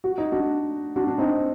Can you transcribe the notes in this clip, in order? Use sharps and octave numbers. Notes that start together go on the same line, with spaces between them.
F#4
D#4
D4 F#4
D4 F#4
D4
C4 D#4